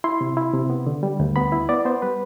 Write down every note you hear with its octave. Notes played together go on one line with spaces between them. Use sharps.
E4 C6
C3
E4
C3
B3
D3
G3
D2
B3 B5
E4
B3 D5
B3 C5
G3 B4